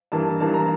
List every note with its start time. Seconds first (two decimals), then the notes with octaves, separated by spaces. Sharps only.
0.12 G2 E3 A#3 A5
0.40 G2 E3 A#3 A5
0.54 A#5